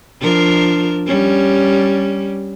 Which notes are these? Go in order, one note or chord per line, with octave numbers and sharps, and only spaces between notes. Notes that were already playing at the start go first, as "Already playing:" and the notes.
F3 D4 A#4
G3 C#4